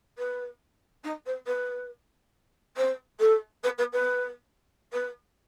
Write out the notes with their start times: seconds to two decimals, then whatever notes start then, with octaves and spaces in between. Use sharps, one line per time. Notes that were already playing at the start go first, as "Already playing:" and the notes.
0.18 B4
1.03 D#4
1.25 C5
1.46 B4
2.76 C5
3.19 A4
3.63 B4
3.78 B4
3.92 B4
4.92 B4